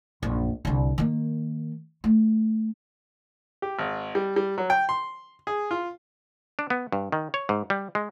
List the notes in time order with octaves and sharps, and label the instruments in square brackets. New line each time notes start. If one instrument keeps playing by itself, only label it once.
[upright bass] A#1 F#2
C2 D3
D#3 A#3
A3
[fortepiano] G4
G#1
G3
G3
F#3
G5
C6
G#4
F4
[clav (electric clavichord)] D4
B3
G2
D#3
C#5
G#2
G3
G#3